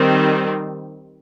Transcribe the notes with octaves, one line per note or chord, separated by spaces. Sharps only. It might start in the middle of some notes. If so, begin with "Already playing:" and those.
Already playing: D#3 G3 C4